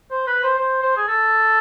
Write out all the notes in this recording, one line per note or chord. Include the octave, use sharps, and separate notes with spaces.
C5
B4
C5
C5
C5
G#4
A4